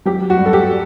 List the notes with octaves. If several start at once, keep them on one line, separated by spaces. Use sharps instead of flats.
F#3 G4
F#4
G2
A4
G4